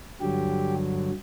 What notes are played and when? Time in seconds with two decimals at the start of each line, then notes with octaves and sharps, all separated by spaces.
0.21 G2 D3 F#3 G4